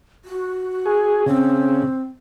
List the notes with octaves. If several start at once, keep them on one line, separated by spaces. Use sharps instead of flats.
F#4
G#4
C#3 C4